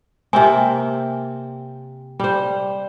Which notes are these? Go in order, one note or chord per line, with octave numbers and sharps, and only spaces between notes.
C3 A#3 C4 G#5
G3 C5